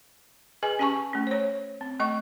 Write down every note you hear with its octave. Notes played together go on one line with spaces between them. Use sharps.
G#4 B4 D#5 G#5
C#4 G4 G#5 A5 C#6
A3 C#4
C5 C#5
C4
A3 D#5 C#6